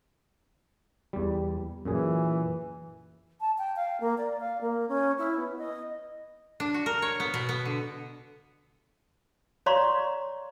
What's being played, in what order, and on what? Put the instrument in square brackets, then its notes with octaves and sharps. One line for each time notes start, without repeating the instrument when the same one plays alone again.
[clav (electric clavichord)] E2 G3
[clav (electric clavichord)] F#2 A#2 G#4 [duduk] E3
[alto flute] A5
G5
F5
A#3
D5
F5
A#3
C#4
E4
B3
D#5
[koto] D4
F#4
A#4
C#5
B3
B2
B3
D3
[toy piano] C#5 D5 F5 A#5 C6 C#6